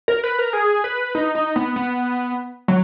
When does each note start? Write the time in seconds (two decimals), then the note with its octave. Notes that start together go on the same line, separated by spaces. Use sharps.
0.08 A#4
0.24 B4
0.38 A#4
0.53 G#4
0.84 B4
1.15 D#4
1.35 D#4
1.56 B3
1.76 B3
2.68 F#3